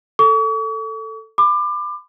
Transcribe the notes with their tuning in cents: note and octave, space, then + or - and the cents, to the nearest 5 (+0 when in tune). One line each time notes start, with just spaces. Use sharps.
A4 +10 C#6 +45
B5 +30 D6 +25